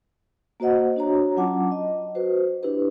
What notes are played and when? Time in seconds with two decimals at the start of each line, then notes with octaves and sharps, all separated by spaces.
0.60 A#3 F#4 C5 D#5 F#5
0.96 D4 F#4 C#5 A#5
1.37 F#3 C#4 F4 F#5 A5 D6
1.72 D#5
2.15 F#4 B4 C5
2.63 D4 E4 G4 B4